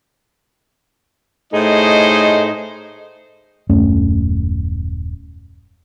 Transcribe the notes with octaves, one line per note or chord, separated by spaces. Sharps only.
A2 A3 D#4 G#4 C5 D#5
D#1 F#2 A3 C#4